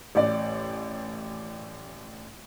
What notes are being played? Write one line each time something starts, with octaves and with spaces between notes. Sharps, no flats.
A1 D5